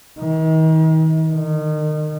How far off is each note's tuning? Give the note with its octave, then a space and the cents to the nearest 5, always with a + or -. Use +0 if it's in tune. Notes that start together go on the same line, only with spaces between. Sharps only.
D#3 +40
D#3 -30